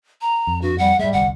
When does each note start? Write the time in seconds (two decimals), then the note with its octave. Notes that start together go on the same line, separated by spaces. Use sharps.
0.21 A#5
0.47 F2
0.62 G2 F#4
0.78 G3 F#5
0.99 G#2 G3 G#3 E5
1.13 G1 C2 F#5